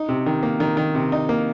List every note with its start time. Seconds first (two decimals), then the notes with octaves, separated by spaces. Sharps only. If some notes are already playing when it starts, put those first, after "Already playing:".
Already playing: D#4
0.09 C3
0.26 D#3
0.43 A#3
0.60 D#3
0.77 D#3
0.95 C3
1.12 D#4
1.29 A#3